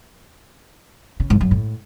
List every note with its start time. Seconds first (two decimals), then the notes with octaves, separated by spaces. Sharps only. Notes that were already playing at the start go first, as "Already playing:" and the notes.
1.20 C#3
1.30 G#2
1.41 F#2
1.51 A2